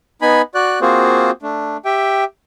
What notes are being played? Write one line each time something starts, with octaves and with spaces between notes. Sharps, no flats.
B3 D#4 G#5 B5
F#4 D5 F#6
A#3 C4 F4 F#4 G#4 C5
A3 D4
G4 E5 G5